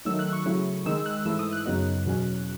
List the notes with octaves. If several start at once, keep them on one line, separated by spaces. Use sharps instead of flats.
D#3 F#3 A3 D#4 E6
F#6
C#6
C#3 F#3 A3 E4
D#3 G#3 D#4 E6
F#6
G#2 E3 A3 E4 E6
D#6
F#6
F#2 C#3 F#3 B3 D#4
E2 B2 F#3 C#4